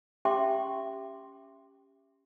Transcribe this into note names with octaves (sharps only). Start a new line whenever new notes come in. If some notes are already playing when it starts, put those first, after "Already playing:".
C#4 G4 E5 G5 C6 D6